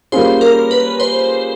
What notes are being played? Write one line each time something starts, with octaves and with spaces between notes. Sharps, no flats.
G3 A#3 C#4 F4 G#4 C5
A#4
B4
C5